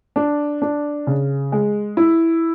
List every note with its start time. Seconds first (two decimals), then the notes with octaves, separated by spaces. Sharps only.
0.16 D4
0.62 D4
1.07 C#3
1.52 G#3
1.97 E4